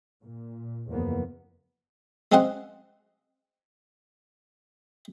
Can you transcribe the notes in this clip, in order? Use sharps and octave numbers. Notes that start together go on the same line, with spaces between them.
A#2
F#1 E2 F3 A#3 B3
G#3 C4 C#4 D#5 F5 F#5